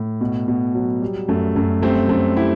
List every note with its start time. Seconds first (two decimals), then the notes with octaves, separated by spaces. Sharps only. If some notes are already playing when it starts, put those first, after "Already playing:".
Already playing: A2
0.21 B2
0.48 B2
0.74 F#3
1.02 G3
1.28 F#2 A3
1.56 F#2 A3
1.82 G3 A3 C4
2.09 F#2 A3 C4
2.37 E4 G4